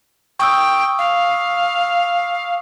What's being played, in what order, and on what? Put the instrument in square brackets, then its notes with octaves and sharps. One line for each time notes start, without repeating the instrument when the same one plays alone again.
[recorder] G5 [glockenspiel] C#6 D#6 E6
[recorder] F5